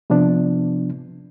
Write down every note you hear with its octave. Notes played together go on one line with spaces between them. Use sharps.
C3 F3 B3 D4